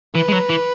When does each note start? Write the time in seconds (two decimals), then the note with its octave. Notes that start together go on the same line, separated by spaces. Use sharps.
0.15 E3 B4
0.29 G#3
0.33 F#3
0.50 E3